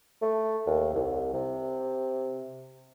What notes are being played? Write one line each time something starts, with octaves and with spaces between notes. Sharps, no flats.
A3
D#2
C2
C3